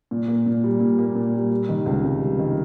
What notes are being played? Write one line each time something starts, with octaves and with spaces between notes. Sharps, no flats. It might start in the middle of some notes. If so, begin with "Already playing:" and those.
A#2
A#3
A#2
G3
A#2
A#3
A#2
G3
G3
D#3
C#2
C3
G3
D#3